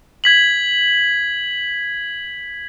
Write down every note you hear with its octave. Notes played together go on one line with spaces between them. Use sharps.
G#6 B6 F#7